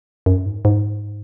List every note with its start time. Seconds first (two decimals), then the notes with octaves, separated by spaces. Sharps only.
0.26 F#2
0.46 G#2
0.65 G#2